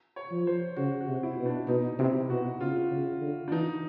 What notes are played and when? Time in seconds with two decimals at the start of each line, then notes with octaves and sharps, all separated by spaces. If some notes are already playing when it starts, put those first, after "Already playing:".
0.16 C#5
0.31 F3
0.47 C5
0.76 C#3 F#4
1.00 F#4
1.07 C3
1.23 E4
1.39 B2
1.46 D4
1.68 B2 D#4
1.99 C3 E4
2.30 B2 F#4
2.60 C#3 F4
2.91 C#3
3.21 D3
3.48 D4
3.51 E3 D#4